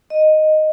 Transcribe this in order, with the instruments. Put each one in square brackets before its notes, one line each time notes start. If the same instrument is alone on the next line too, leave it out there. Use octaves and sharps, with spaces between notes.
[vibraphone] D#5